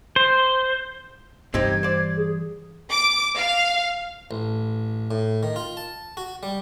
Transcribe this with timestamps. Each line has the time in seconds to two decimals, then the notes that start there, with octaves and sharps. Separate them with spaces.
0.16 C5
1.54 G2 E3 C4 D#4 G4 G#6
1.83 C5 D5
2.17 G#4
2.91 D6
3.37 F5
4.31 A1
5.11 A2
5.43 D#3
5.56 F4
5.77 A5
6.17 F#4
6.43 G3